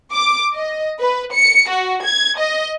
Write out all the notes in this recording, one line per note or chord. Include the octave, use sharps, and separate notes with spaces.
D6
D#5
B4
C#7
F#4
G#6
D#5